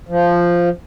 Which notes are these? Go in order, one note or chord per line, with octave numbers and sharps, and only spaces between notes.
F3